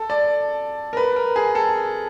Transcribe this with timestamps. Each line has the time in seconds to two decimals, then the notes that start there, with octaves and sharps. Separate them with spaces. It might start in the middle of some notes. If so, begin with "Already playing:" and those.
Already playing: A4
0.10 D5
0.93 A#4
0.97 B4
1.16 A#4
1.36 G#4
1.55 A4